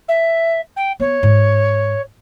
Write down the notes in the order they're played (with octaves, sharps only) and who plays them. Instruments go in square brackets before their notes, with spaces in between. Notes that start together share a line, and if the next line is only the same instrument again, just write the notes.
[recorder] E5
G5
[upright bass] B3 [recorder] C#5
[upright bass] G#2